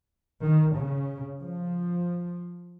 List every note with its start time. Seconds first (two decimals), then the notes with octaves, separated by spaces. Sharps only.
0.42 D#3
0.75 C#3
1.41 F3